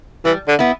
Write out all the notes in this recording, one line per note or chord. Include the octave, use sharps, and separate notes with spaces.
E3 G3
D3
B3 E4